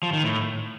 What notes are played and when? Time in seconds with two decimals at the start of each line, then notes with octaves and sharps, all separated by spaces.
0.03 F3
0.13 D#3
0.23 A2